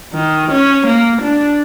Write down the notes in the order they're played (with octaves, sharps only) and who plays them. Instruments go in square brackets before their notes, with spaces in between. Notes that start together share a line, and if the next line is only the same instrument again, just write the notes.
[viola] D#3
C#4
A#3
D4